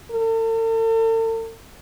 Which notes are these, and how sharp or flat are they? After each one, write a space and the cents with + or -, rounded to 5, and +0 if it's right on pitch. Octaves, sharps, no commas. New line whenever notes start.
A4 +45